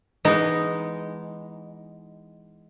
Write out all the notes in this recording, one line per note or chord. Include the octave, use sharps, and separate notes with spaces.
E3 G#3 B3 D#4